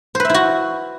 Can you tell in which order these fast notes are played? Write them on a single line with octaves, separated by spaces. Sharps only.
C5 B4 E5 E4 F#4